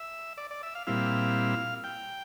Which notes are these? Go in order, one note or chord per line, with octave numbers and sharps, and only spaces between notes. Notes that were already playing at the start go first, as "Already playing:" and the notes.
Already playing: E5
D5
D5
E5
F5
A#2 G3 C4 E4 F5
G5